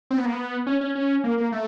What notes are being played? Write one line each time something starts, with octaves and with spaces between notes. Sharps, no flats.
C4
B3
A#3
B3
C#4
C#4
C#4
A#3
A#3
A3